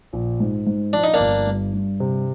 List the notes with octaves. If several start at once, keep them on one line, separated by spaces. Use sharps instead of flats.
A#1
G#2
G#2
F3 D4
D#4
A#3 D4
G1
G2
G2
C3